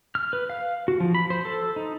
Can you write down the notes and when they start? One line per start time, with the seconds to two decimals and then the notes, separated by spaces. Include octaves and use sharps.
0.15 F6
0.33 B4
0.50 F5
0.88 F#4
1.00 F3
1.15 B5
1.30 C5
1.45 A4
1.76 D#4